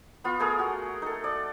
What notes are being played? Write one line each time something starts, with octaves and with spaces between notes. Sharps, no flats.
B3 F4
A3 G#4 A#4
F#4
D#4 A4
D5